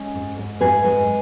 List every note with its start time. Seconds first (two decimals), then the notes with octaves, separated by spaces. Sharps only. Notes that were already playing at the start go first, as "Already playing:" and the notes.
Already playing: G#3 C#4
0.15 G#2
0.38 G#2
0.61 G#2 G#4 B4
0.85 G#3